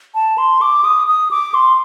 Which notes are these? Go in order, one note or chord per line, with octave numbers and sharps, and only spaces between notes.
A5
C6
D6
D#6
D#6
D6
C6